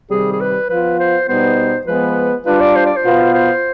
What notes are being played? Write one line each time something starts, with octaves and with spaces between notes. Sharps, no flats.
C3 D#3 G3 G#4
G#4
B4
F3 B3 F4 B4
C5
B2 G3 B3 D#4 C5
F3 G#3 B3 B4
G3 D4 F4 B4
D5
C5
D5
C5
B2 B3 F4
C5